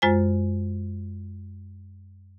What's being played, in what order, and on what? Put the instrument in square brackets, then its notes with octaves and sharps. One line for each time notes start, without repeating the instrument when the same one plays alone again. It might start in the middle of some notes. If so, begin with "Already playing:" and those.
[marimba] F#2 G#3 F4 C5 G#5